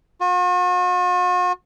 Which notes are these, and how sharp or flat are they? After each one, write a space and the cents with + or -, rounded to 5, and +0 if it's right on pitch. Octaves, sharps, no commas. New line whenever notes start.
F#4 -45